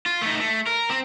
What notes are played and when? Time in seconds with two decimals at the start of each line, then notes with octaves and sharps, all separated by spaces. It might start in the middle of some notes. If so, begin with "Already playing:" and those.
0.06 F4
0.22 A3 D#4
0.40 A3
0.66 A#4
0.90 C4